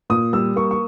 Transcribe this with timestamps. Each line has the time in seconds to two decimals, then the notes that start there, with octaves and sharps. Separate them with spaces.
0.10 A#2 D#6
0.33 G3 E6
0.56 A#3 C#6
0.71 C#6